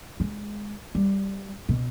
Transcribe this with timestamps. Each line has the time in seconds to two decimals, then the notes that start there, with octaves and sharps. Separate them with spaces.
0.20 G#3
0.95 G3
1.69 B2